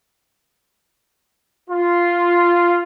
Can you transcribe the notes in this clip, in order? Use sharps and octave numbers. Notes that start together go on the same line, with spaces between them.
F4